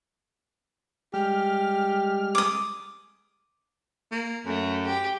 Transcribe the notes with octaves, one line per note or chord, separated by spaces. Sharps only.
G3 G#3 G4 F6
D6 D#6
A#3
F#2 A3
G4